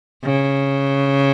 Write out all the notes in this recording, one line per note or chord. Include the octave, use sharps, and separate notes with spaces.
C#3